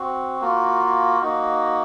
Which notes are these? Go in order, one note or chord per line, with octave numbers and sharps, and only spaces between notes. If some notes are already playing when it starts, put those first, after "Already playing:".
Already playing: C4 F#4
A#3 F4 F#4
A#3 D#4 F#4